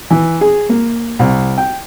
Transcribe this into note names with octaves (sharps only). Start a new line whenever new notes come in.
E3
G#4
A#3
C2
G5